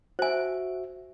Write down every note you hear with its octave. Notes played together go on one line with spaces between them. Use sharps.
F#4 C5 E5 G#5